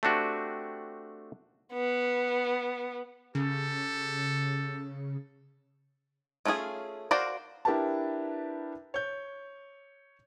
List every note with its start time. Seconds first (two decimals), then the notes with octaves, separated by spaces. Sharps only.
0.03 A3 C4 D4 F#4 G4
1.74 B3
3.35 C#3 G4 A4
6.45 A3 C#4 F4 F#4 G#4
7.11 F#4 A#4 C5 D5 F5
7.65 D4 E4 G4 A#4 B4 A5
8.94 C#5 G6